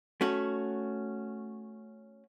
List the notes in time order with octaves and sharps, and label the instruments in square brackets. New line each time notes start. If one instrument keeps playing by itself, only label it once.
[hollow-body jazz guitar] A3 C#4 F#4